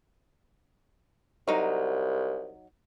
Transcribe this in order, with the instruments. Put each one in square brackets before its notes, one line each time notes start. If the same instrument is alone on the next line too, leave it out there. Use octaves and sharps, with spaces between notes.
[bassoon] C2 [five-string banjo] F#3 D#4 D#5